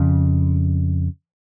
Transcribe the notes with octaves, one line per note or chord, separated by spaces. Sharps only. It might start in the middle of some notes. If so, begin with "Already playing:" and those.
Already playing: F2 C#3